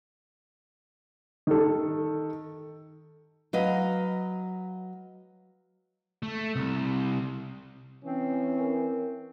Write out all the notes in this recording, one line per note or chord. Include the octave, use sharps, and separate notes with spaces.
D#3 A4
F#3 B4 D#5 F5
A3
C2
E3 C4 C#4
A#4